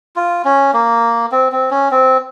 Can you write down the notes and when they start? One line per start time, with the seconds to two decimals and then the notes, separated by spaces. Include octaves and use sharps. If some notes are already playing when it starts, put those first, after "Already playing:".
0.16 F4
0.45 C#4
0.73 A#3
1.32 C4
1.52 C4
1.71 C#4
1.91 C4